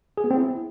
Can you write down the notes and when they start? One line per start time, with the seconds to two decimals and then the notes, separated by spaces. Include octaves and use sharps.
0.17 G#4
0.24 B3
0.31 C4
0.37 E4